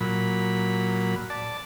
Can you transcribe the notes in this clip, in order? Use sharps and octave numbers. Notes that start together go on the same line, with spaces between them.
A#2 F#3 B5
D5 A5